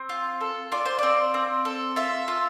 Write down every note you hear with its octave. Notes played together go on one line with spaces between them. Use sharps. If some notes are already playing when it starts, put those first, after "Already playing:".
Already playing: C4
F4
A4
F4 D5
C5
C4 D5
C4
A4
F4 E5
F4